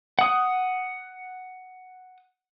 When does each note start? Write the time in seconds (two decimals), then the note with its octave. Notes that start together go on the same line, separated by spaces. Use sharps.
0.19 F#5 D#6